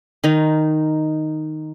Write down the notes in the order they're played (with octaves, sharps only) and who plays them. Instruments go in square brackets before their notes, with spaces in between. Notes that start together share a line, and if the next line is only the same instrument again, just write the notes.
[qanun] D#3 D#4